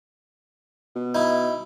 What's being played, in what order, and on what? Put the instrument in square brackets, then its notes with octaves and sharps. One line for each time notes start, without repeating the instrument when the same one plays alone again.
[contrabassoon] B2
[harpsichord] D#4 E4